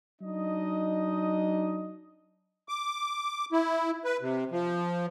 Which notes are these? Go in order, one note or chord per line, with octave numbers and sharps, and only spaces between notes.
F#3 D4 D#4 D#5
D6
E4
B4
C3
F3